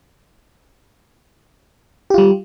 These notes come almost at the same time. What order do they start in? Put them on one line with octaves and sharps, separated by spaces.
G4 F4 G3